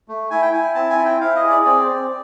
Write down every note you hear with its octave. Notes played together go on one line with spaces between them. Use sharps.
A3
E4 G#5
G5
E4 G#5
C4 A5
G#5
E4
G5
E4 F5
D#5
G#4
D5
C4 D5
C4